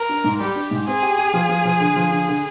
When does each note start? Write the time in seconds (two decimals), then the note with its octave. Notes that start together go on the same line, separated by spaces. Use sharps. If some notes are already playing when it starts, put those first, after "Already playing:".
Already playing: A#4
0.09 D4
0.24 G#2
0.40 G3 G4
0.56 D4
0.71 G#2
0.86 C4 G#4
1.02 G4
1.18 G4
1.34 F3
1.49 F3
1.65 F3
1.80 D3
1.96 F3
2.11 D3
2.28 D3